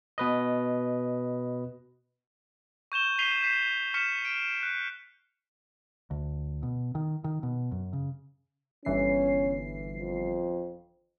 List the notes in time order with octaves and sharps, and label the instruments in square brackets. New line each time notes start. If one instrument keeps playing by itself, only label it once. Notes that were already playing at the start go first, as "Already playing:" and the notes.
[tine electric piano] B2 B4 D#5
[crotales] C#6 G6 E7 G7
G6 B6 C7 D#7 F7 G7
G6 B6 C7 E7
C#6 F6 B6 C#7 E7
D7
F#6
[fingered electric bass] D2
B2
D#3
D#3
B2
F#2
C#3
[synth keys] G1 E3 C7 [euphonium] C#4
[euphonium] F2